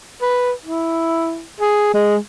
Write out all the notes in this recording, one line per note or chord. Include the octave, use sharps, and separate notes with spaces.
B4
E4
G#4
G#3